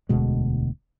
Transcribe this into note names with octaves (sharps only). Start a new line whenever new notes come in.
E1 D2 B2 G#3